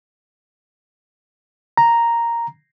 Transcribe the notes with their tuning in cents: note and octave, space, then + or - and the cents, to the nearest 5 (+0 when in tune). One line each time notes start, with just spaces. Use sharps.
A#5 +0